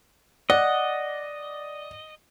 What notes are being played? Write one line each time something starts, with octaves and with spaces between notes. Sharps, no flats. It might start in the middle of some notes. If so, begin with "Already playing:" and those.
D5 D#5 F#5